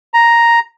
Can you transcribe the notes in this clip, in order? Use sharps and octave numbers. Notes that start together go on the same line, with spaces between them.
A#5